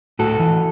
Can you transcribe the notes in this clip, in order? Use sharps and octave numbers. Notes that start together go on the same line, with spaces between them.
A2 F#4 A4
E3